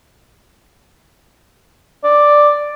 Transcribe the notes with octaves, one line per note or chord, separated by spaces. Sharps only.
D5